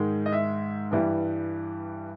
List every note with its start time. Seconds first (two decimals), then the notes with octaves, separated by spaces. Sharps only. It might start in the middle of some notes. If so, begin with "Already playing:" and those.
Already playing: G#2 D#3 G#3
0.26 D#5
0.33 E5
0.91 G2 E3 G3